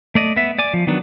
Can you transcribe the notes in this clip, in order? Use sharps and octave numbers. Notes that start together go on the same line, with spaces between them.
A3 D5 D#5
B3 E5
D5 G#5 D6
F3
D#3 F#3 B3 D4